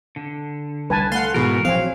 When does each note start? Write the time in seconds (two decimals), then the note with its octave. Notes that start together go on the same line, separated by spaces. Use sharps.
0.16 D3
0.90 C2 B4 G#5 A5
1.12 A3 F5 F#5 C6 C7
1.34 G#2 B2 E3 F#4 G#4 A#4
1.65 A#1 F#3 C4 F5 G#5